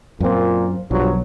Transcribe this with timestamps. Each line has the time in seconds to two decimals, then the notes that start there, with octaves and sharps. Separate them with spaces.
0.20 F#2 A#2 C4
0.91 B1 G2 F3 F#3